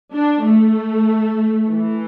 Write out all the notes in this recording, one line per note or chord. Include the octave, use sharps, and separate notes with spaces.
D4
A3
E3